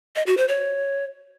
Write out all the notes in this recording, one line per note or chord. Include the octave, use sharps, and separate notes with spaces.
D#5
F#4
C5
C#5